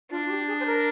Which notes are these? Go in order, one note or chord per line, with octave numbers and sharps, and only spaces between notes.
D4 F4
F4
G4
G#4
C5
A#4